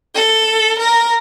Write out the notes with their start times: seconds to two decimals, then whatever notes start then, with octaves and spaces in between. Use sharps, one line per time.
0.15 A4
0.80 A#4